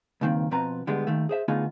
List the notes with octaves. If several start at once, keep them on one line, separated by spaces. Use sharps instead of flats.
C#2 G2 D#3 A#3 C4
B2 F3 C4 B4 A#5
D3 G3 G#3 B3
D#2 D#3 A3
G#4 C5 E5
D3 A3 B3 D#4 F4 G#4